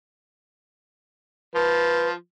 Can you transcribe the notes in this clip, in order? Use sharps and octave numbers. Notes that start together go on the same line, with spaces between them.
F3 B4